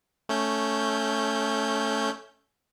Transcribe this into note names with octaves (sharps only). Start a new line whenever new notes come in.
A3 C#4 G6